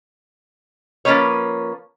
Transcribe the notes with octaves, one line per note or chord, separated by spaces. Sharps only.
F3 A#3 B3 C#4 B4 C#5